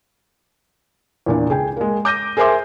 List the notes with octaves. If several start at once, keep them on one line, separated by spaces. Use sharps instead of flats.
E2 A#2 D4
C#2 G#4 G5
G#3 A#3
D6 G6 A#6 D#7
G#4 A#4 C5 E5 C6 D6